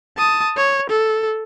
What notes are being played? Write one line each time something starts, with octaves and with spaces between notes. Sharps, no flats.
A5 D#6
C#5
A4